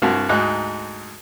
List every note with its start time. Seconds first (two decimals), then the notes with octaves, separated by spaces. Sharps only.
0.02 C2 G2 F#4
0.29 D2 G#2 D#4 F#6